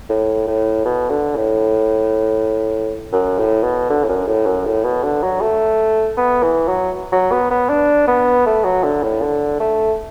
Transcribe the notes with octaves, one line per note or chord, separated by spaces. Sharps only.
A2
A2
B2
D3
A2
F#2
A2
B2
D3
A2
F#2
A2
F#2
A2
B2
D3
F#3
A3
B3
E3
F#3
F#3
B3
B3
D4
B3
A3
F#3
D3
A2
D3
A3